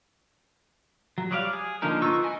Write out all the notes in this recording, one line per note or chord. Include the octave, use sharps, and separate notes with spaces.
F#3
F#3 G3 D5 D#5 F5
G#4
D3 F3 A#3 D#4 A#4
B3 D#4 F4 C#6 E6
D#4 E4 D#5 G#5